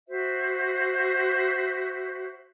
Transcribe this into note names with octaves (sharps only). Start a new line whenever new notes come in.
F#4 C5 E5